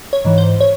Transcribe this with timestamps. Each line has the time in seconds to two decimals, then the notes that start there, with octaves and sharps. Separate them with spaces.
0.13 C#5
0.25 G#2 E3
0.38 C5
0.60 C#5